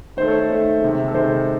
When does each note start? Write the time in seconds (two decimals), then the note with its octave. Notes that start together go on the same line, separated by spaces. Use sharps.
0.17 D#3 A3 C5
0.28 A4 C#5
0.39 A4 C#5
0.50 D#3 A3
0.82 C3 D#3 G#3
1.08 A4
1.14 C3 D#3 G#3 C5